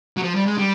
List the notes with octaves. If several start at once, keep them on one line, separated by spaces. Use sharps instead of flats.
F#3
F3
G3
G#3
G3